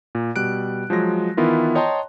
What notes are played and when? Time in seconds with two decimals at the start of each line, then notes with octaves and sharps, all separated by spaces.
0.15 A#2
0.36 B2 G3 F#6 D7
0.90 F3 F#3 G#3 A#6
1.37 D#3 E3 B3 E4 F4 A#4
1.75 C#5 D#5 G5 A5 A#5 C6